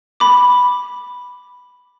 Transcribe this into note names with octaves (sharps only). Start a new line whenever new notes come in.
B5 D6